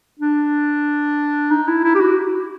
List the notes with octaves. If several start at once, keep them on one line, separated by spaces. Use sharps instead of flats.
D4
D#4
E4
E4
G4
F#4